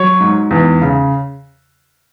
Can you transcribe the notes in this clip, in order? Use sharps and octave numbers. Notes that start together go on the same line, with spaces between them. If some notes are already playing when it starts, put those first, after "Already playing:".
Already playing: F#3 C#5
G#2
E2
C#3